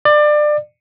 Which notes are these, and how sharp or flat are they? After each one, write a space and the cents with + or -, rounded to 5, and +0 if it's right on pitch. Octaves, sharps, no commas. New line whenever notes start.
D5 +25